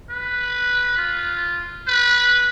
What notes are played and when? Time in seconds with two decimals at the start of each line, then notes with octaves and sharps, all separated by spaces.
0.10 B4
0.97 F4
1.87 B4